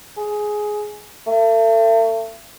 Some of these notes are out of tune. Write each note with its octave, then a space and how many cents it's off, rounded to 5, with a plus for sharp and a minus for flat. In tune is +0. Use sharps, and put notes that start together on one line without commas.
G#4 +10
A3 +40